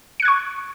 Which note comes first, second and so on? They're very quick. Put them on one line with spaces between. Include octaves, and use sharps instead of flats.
C#7 F#6 G#6 C#6